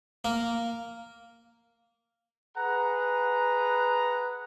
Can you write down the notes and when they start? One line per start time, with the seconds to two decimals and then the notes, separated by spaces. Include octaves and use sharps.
0.25 A#3
2.57 G#4 B4 F#5 A#5